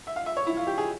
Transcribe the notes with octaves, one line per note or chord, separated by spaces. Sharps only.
E5
F5
E5
C#5
E4
F4
G4
G#4